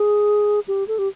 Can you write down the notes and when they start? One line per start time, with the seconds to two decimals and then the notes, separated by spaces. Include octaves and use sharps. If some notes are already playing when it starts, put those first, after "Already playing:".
Already playing: G#4
0.68 G4
0.88 A4
0.99 G4